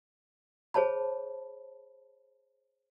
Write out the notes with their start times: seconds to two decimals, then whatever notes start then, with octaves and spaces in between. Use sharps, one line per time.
0.74 G#4 C5 C#5 A5 B5